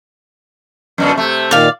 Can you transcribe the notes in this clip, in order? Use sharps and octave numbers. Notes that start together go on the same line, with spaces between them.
F#2 B2 D3
C3 A3
A#2 D#3 D5 F5